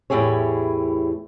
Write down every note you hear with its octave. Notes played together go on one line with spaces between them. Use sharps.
E2 A2 E4 G4 G#4 C#5